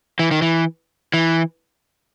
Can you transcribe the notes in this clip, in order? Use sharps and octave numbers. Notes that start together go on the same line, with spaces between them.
E3
D#3
E3
E3